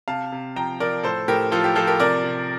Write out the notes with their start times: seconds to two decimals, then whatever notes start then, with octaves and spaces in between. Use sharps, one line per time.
0.08 C3 F5 A5
0.32 C3
0.56 F3 G5 A#5
0.80 F3 A#4 D5
1.03 A2 A4 C5
1.28 A2 G4 A#4
1.51 F3 F4 A4
1.64 G4
1.76 F3 F4 A4
1.87 G4 A#4
2.00 C3 A#4 D5
2.24 C3